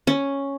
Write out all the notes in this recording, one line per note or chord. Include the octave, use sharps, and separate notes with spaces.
C#4